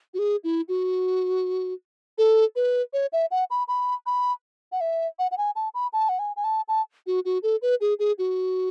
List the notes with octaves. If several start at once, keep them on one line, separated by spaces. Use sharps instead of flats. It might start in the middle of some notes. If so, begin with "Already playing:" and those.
F#4
G#4
E4
F#4
A4
B4
C#5
E5
F#5
B5
B5
B5
F#5
E5
F#5
F#5
G#5
A5
B5
A5
F#5
G#5
G#5
A5
A5
F#4
F#4
A4
B4
G#4
G#4
F#4